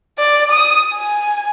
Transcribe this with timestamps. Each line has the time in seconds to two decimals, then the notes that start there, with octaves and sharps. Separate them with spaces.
0.18 D5
0.52 D#6
0.95 G#5